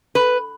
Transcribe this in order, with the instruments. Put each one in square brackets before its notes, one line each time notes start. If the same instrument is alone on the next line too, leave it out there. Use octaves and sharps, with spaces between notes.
[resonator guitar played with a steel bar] B4